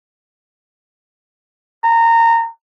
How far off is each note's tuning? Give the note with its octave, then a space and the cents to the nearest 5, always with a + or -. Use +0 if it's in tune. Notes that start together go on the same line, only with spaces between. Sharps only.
A#5 -20